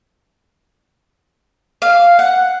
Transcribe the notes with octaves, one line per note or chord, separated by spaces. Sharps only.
F5
F#5